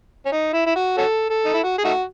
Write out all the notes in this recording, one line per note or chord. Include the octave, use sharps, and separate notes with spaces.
C#4
D#4
E4
E4
F#4
C#4 F#4 A4
A4
D#4
E4
F#4
G#4
A3 D#4 F#4